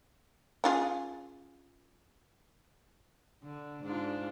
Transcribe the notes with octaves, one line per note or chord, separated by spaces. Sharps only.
C#4 F4 G#4
D3
G#2 D4 F4